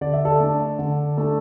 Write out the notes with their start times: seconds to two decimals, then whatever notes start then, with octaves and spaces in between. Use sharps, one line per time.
0.01 D3 D5
0.13 E5
0.25 A4 D5
0.40 A3 D4
0.79 D3
1.18 A3 D4